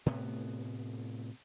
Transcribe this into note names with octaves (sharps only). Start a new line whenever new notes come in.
A2 C3 B3